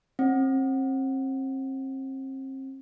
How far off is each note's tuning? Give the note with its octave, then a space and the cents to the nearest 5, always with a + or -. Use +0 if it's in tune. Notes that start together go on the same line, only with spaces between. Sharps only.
C4 +35